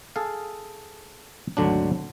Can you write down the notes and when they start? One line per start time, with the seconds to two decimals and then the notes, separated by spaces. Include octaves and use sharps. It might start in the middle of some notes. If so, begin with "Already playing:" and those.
0.16 G#4 A4 F5
1.57 G#1 D2 D3 F#3 D4